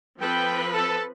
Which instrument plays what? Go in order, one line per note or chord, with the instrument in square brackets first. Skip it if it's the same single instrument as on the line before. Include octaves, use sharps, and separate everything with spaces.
[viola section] F3 C4 B4 [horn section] A4 G5
[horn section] A4